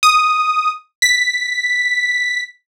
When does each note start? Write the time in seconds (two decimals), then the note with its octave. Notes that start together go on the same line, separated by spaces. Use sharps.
0.03 D#6
1.02 B6